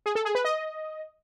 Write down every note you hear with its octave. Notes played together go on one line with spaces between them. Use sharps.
G#4
A4
G#4
B4
D#5